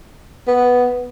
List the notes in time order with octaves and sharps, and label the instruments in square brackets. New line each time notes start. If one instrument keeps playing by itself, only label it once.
[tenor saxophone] B3